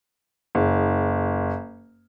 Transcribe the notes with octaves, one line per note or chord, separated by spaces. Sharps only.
F#1